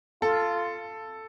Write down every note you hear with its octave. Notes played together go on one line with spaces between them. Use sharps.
F4 A4